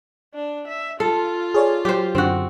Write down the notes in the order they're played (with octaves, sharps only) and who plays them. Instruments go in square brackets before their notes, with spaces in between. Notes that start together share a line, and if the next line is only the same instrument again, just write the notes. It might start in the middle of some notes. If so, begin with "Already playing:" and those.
[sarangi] D4
E5
[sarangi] F4 [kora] A4
[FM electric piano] G#4 C#5 D5
[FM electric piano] F#3 [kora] G4 C5
[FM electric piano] F#2 D3 [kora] C4 F#4